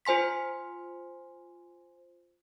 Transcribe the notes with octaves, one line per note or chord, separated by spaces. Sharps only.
F4 C5 G#5 C6 B6